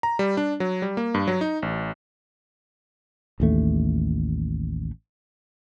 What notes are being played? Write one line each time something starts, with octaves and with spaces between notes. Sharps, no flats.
A#5
G3
D4
F#3
G3
A#3
G2
F#3
D#4
A1
A1 D#2 A3